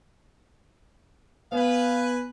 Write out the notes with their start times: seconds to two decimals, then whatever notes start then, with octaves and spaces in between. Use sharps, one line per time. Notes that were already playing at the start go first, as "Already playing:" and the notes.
1.52 B3 B4 F5 G#5